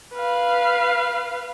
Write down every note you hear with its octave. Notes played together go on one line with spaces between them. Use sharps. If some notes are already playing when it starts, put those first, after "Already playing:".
B4 F5